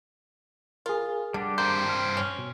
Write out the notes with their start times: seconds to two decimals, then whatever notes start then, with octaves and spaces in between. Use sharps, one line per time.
0.86 F4 G#4 A#4
1.34 D3 G3 D4 G4
1.58 G2 A#3 C5 G6
1.89 F6
2.17 C#4
2.39 B2